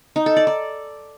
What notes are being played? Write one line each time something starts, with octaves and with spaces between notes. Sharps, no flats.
D#4
A4
D5
D5